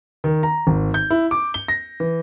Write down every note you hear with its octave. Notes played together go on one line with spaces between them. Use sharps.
D#3
A#5
G#1
G6
E4
D6
G7
A#6
E3